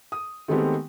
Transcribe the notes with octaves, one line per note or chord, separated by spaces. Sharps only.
D#6
D#3 G#3 A3 B3 C4 G4